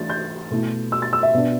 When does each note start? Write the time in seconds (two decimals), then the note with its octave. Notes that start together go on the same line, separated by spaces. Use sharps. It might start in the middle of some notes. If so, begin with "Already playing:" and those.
Already playing: E3 A3 D4 A6
0.10 G6
0.51 B2 A3 E4
0.92 E6
1.02 A6
1.13 E6
1.23 E5
1.34 B2 B3 D4